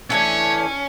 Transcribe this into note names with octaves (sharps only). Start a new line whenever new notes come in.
E3 A3 C#4 D4 C#5